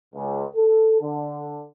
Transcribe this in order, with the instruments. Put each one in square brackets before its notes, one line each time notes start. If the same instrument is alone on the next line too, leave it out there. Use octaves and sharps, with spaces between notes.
[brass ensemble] C#2
A4
D3